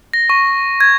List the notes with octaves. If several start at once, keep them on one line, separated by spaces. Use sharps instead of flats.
A#6
C#6
G#6